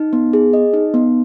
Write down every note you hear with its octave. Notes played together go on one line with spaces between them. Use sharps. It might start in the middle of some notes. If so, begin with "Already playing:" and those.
Already playing: D#4
B3
G#4
D#5
D#4
B3